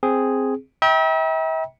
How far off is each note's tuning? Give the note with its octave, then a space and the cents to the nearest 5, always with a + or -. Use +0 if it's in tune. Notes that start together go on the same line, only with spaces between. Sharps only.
C4 +0 G#4 +0
E5 -40 G5 +0 A#5 +45